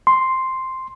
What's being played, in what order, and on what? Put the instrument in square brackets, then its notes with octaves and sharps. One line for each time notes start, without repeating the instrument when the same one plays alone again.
[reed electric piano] C6